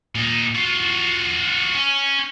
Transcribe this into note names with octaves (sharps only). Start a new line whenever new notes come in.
A#2 D#4
F4 F#4
C#4